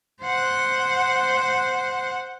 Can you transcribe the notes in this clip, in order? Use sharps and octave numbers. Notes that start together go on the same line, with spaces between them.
C5 F#5